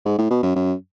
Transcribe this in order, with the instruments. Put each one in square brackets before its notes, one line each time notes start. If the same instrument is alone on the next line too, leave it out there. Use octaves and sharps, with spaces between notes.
[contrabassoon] G#2
A2
B2
F#2
F#2